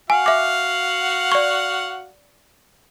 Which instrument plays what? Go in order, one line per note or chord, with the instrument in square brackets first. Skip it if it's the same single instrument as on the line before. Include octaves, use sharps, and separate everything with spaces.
[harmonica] F#4 F5 F#5 [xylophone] G#5
[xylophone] E5 D6
D5 C#6